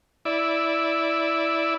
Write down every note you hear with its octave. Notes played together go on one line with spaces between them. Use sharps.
E4 D5